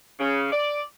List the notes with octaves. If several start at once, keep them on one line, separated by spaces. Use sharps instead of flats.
C#3
D5